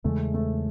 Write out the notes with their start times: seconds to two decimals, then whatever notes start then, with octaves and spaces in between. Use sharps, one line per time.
0.04 E2 C#3 E3 G#3 A3
0.34 A3